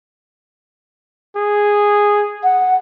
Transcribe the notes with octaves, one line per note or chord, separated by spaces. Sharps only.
G#4
F#5